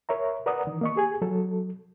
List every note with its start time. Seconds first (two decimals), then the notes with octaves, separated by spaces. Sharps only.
0.09 A#4 C#5 E5 A#5
0.46 A#4 B4 D5 F#5 A#5 D#6
0.67 D#3 E3
0.81 A#3 D#5 C#6
0.96 G4 G#4 G#5
1.22 F#3 A4